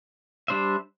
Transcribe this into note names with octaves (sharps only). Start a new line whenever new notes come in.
G3 D4 C5 E5